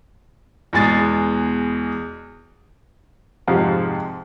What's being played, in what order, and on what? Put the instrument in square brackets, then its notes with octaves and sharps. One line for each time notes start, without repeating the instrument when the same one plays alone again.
[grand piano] E2 B2 G#3 A6
[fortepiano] F2 G#2 C3 F3 F#5